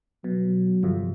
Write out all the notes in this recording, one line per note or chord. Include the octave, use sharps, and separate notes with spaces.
B2 F#3
G1 F2 C3